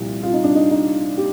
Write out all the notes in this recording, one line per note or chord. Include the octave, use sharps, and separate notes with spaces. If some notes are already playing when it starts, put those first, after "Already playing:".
Already playing: C2 A#2 F3
F4
D#4
D4
D#4
D#4
G4